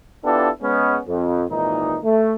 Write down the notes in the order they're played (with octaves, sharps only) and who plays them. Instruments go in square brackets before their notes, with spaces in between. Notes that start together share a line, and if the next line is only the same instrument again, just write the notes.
[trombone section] B3 D4 E4 F4 G4 A4
G#3 B3 C#4
F2
G#1 A#2 E3 D#4
A3